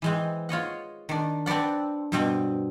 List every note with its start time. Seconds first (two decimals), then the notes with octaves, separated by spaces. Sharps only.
0.02 E3 G#3 C4
0.49 F4 C#5 D#5 F#5
1.09 D#3 D4
1.46 C4 D4 B4 D5 F#5
2.12 G2 B2 C4